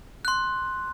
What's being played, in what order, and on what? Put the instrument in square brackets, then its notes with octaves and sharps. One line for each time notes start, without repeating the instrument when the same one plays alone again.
[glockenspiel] C6 F#6